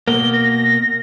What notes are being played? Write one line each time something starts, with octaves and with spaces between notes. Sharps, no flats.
B2 A#3 G7
A#6